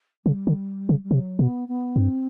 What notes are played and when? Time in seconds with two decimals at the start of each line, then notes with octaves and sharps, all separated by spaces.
0.25 C#3 G3
0.47 D3
0.89 C#3
1.03 G3
1.10 C3 F#3
1.39 B2 B3
1.68 B3
1.96 G2 C4